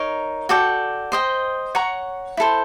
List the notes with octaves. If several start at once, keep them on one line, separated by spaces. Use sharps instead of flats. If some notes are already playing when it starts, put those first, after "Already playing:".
Already playing: D#4 A#4 C#5
F#4 A4 D5 G5
C5 D#5 G5
C#5 F#5 A#5 C#6
E4 A4 C5